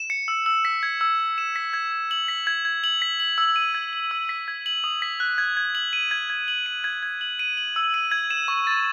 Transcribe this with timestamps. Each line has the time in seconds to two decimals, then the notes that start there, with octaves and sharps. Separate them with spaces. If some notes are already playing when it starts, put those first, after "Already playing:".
Already playing: E7
0.10 C#7
0.28 E6
0.46 E6
0.65 B6
0.83 G#6
1.01 E6
1.19 E6
1.38 E7
1.56 B6
1.73 G#6
1.92 G#6
2.11 F#7
2.28 B6
2.47 G#6
2.65 G#6
2.84 F#7
3.02 B6
3.20 F#7
3.38 E6
3.56 D#7
3.75 G#6
3.93 F#7
4.11 E6
4.29 B6
4.48 G#6
4.66 F#7
4.84 D#6
5.02 B6
5.20 F#6
5.38 G#6
5.57 G#6
5.75 F#7
5.93 D#7
6.11 G#6
6.30 G#6
6.48 F#7
6.66 D#7
6.84 G#6
7.03 G#6
7.21 F#7
7.39 D#7
7.57 F#7
7.76 E6
7.94 D#7
8.11 G#6
8.30 E7
8.48 C#6
8.67 A6